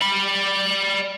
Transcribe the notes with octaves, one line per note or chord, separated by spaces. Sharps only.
D5 B5